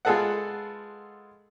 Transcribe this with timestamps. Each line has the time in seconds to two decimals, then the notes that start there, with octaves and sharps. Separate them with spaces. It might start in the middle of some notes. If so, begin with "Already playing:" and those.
0.05 G#3 F4 G#4 A4 B4 F#5